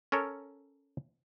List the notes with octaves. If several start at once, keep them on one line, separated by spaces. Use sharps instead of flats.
C#4 A4 A#4 C#5